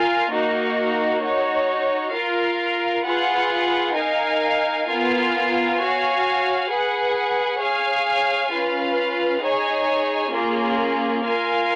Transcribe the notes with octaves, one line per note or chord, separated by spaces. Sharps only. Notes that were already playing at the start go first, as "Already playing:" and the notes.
Already playing: F4 A#4 F5 G#5
A#3 D#4 F#4 A#4
D#4 F#4 C#5
F4 A#4 F5
F4 G#4 B4 F#5
D#4 A#4 F5 G#5
B3 F4 A#4 F5 G#5
F#4 C#5 F5 G#5
G#4 B4 F#5
G#4 C#5 F5 G#5
C#4 F4 B4 F5
D#4 G#4 C#5 G#5
A#3 C#4 F4 G#4
F4 A#4 F5 G#5